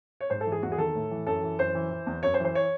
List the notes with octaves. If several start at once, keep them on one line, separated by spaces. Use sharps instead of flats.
C#5
G#2 C5
A4
E3
G#4
E2 F#4
G#4
D#3 A4
A2
E3
F#2 A4
E3
F#2 C5
E3
E3
E2
F#2 C#5
C5
E3
C5
C#5